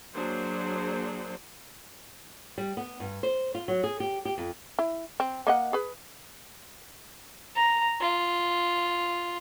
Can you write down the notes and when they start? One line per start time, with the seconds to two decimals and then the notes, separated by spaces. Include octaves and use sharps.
0.14 F#3 A#3 D4 G#4 C5
2.58 G3
2.77 B3
3.00 G2
3.23 C5
3.55 F4
3.68 F#3
3.84 G#4
4.00 G4
4.25 G4
4.38 F2
4.79 E4
5.20 C4
5.47 A#3 D#5 F#5
5.73 G#4 B4
7.56 A#5
8.01 F4